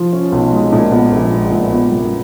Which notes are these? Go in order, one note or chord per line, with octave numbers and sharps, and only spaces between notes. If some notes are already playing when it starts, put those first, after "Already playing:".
Already playing: F3
C#4
B1
G#3
A#2
B3
A#1
G#3
A#2
B3
F#2